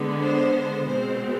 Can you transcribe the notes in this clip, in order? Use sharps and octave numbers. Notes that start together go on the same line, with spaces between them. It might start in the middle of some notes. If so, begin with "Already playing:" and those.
Already playing: D3 G#3 B3
C5
B2 G#3 C4 C5